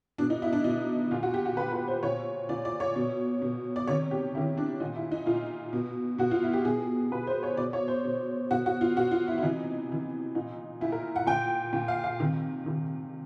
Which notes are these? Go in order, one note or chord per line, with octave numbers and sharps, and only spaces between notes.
B2 D4
D#4
E4
D4
B2 D#4
A#2 F4
F#4
G4
F#4
A#2 B4
B4
C5
A#2 C#5
A#2 D5
D5
C#5
B2
B2
D5
C3 D#3 C#5
G4
C3 D#3 E4
D4
A#2 D#4
E4
D#4
A#2 F4
B2
B2 F#4
F4
E4
G4
B2 G#4
B2 B4
C5
C#5
B2 D5
C#5
C5
B2
B2 F#4
F#4
F4
B2 F#4
F4
E4
E4
C3 E3 D#4
C3 E3
A#2 D#4
A#2 E4
A#4
F#5
A#2 G5
A#2
F5
F5
C3 D#3
C3 D#3